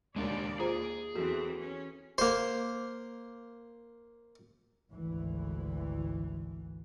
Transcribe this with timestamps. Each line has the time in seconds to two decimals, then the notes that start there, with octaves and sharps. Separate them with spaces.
0.16 D#2 G#3 D4 A#4 D5
0.60 F4 G#4 C5 A#5
1.16 E2 E3 C4 F#4 A4
1.59 C#4
2.18 A#3 C5
4.92 G#1 D2 E3